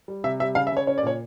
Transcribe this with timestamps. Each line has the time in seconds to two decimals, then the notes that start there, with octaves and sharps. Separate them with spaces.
0.08 G3
0.24 C3 E5
0.40 G3 E5
0.55 C#3 F5
0.67 E5
0.72 C#3 C#5
0.87 C#4 C#5
0.98 D5
1.03 A#2 C#5